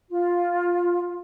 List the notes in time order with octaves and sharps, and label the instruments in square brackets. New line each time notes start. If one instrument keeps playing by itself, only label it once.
[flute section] F4